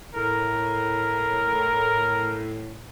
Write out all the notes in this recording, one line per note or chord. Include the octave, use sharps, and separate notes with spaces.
A2 A#4